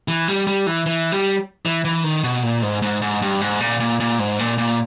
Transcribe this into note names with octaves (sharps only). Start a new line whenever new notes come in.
E3
G3
G3
E3
E3
G3
E3
E3
D#3
B2
A#2
G#2
G#2
G#2
G2
G#2
A#2
A#2
A#2
G#2
A#2
A#2